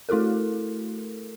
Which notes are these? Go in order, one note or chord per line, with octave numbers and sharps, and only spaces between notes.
A3 E4 F#4 A4 A#4